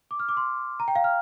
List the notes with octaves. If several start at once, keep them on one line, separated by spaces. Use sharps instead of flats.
D6
F6
D6
C6
A#5
G5
F5
F6